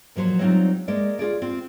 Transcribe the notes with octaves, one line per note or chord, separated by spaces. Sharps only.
A#2 F3 F#3 C5
F#3 G3 C4 D#4 F4
G#3 A#3 D5
F4 F#4 G#4 D5
C4 F4